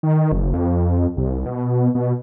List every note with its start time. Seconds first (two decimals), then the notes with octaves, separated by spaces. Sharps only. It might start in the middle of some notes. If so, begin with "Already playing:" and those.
0.03 D#3
0.32 F#1
0.54 F2
1.17 C2
1.46 B2
1.95 B2